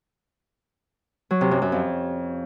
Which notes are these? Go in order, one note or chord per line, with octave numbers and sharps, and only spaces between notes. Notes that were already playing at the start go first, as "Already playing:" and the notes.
F#3
C3
F#2
F#2
F2